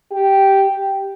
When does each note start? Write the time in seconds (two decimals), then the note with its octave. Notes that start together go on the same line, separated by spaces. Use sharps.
0.11 G4
0.69 G4